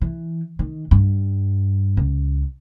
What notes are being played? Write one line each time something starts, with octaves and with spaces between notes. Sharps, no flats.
E3
D#3
G2
C#2